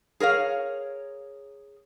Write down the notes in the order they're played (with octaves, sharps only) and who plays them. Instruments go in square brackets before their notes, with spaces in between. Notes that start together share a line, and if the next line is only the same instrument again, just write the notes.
[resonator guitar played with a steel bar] G#4 A#4 C#5 F5